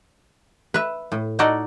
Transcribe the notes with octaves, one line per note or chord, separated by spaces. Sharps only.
B4 E5
A2
D#4 F#4 A4 D5 D#5